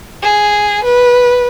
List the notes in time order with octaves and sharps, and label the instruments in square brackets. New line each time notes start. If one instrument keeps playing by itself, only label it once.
[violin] G#4
B4